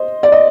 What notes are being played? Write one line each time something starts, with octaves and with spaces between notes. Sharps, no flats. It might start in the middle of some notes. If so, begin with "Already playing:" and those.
Already playing: C5 D#5
D5
D#5